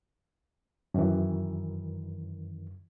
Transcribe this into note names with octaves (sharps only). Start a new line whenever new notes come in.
F#2 D#3 E3